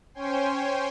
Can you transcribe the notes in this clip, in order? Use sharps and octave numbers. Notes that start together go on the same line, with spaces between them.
C#4 C5 C#5 G5 G#5 C6